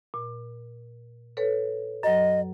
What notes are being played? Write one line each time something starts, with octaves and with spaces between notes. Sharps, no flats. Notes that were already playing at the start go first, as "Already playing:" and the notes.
A#2
A4 B4 C#5
F#2 F#3 D#5